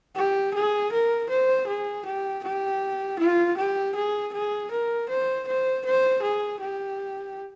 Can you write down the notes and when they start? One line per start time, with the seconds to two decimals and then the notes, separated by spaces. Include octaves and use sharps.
0.16 G4
0.54 G#4
0.92 A#4
1.29 C5
1.67 G#4
2.06 G4
2.44 G4
3.19 F4
3.57 G4
3.95 G#4
4.33 G#4
4.71 A#4
5.09 C5
5.47 C5
5.85 C5
6.23 G#4
6.61 G4